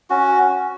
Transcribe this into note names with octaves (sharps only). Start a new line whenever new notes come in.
C#4 F#4